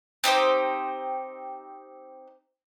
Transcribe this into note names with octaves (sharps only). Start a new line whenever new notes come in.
C4 D#4 G4 C5